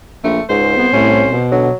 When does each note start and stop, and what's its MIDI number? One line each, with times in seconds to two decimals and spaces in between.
0.24 0.40 34
0.24 0.43 57
0.49 0.76 37
0.49 0.76 44
0.49 1.52 72
0.77 0.87 36
0.77 0.89 59
0.93 1.34 36
0.93 1.22 45
0.93 1.31 61
1.30 1.70 47
1.51 1.68 50
1.51 1.76 54